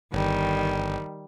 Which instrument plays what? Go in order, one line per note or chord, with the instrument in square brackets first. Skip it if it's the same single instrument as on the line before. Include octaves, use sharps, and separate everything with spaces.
[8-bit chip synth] G1 [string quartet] D#3 G3